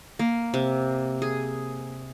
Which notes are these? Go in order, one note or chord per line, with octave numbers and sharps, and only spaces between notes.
A#3
C3
G#4